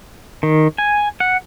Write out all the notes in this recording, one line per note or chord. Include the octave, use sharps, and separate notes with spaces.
D#3
G#5
F#5